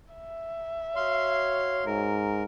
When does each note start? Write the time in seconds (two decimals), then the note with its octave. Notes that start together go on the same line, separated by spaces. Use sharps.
0.14 E5
0.96 F#4 C#5 F5 C6
1.86 G#2 A#4